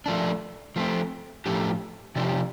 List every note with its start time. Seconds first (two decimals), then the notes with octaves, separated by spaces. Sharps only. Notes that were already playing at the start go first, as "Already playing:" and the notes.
0.06 F3 A3 D4
0.76 F3 A3 C4
1.46 A2 F3 A3 D4 G4
2.16 C3 F3 D4 G4